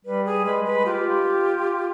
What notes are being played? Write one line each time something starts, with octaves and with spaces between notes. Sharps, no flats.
G3 B4
G#4
G#3 B4
B4
F4 G4